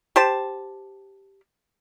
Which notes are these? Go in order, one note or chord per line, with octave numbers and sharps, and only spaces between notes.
G4 C5 A5